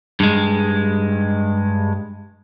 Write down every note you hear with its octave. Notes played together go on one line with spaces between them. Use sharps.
G2 G#3